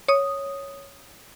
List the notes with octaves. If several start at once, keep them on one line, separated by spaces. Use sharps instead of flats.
C#5 D#6